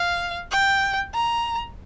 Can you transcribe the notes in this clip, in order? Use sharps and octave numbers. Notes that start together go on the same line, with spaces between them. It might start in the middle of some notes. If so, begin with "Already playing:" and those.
Already playing: F5
G5
A#5